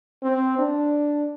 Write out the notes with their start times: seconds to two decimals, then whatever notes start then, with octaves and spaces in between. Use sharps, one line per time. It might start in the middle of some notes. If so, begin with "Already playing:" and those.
0.23 C4
0.58 D4